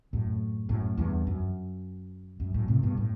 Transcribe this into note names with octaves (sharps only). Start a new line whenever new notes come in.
F#2 A2
F#2 A2
E2 G2
F#2
F#2
F#2 A2
A2 C3
G2 B2
A2